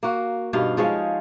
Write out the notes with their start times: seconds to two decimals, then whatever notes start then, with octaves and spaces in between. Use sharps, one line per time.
0.03 A#3 F#4
0.53 G2 B2 D#4 F5
0.77 F3 G#3 C#5 F5